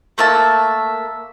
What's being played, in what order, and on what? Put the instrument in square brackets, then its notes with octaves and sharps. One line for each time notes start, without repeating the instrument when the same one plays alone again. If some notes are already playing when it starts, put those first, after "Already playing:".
[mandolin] A3 A#3 E5 A5